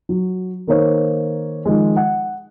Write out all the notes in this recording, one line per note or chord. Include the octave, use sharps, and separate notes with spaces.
F#3
D#3 A#3 C5 C#5
D#3 F3 G#3
F#5